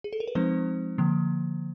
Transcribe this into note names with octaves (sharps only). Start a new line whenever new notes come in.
G#4
A4
A#4
B4
F3 G#3 C4 D#4 C5
D3 F3 A#3